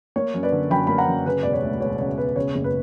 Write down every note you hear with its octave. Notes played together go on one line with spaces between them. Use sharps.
A#3 C#5
F#2
B4 D5
D3
F#2 G5 B5
A#3 B5
F#5 A#5
F#2
C#3 B4
E1 D5
C#5
D2
E1 C#5
C#3 C#5
E1 B4
C#3 C#5
F#1
B4